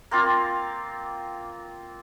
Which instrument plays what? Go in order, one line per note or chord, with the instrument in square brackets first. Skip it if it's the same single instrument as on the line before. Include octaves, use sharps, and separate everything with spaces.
[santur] A#3 C4 F4 D6